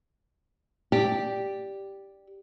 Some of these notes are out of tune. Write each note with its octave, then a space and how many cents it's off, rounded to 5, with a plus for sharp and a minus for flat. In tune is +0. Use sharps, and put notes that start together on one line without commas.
G4 +0 D5 +0